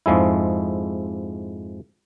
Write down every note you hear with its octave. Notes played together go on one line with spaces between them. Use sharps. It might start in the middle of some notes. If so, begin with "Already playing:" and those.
F2 G#2 F3 G#3 E4